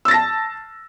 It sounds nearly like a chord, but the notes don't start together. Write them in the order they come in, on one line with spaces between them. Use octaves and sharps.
E6 A6 A#6 A5